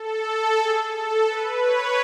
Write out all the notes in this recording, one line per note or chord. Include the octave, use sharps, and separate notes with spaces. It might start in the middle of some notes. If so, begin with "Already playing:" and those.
Already playing: A4
G#4
A4
B4
C#5